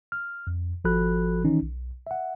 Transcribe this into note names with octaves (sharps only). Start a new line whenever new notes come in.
F6
F2
G#1 F3 F#4 A4 B5 F#6
D#3 E3 C#4 D#4
B1
E5 F#5